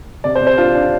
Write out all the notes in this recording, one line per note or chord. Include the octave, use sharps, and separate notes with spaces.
C3 D5
C5
C3
C5
D4 F4
D4